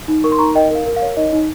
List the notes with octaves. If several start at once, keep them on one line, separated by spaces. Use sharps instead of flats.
D#4
A#4 C#6
C6
D#4 A#5 C#6
A#4 D#5 G5
A#4 F5
A#4
F5
C#5
D#4 D#5
D#4